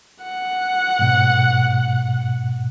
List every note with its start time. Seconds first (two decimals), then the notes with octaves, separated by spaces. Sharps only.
0.22 F#5
0.99 G#2 B2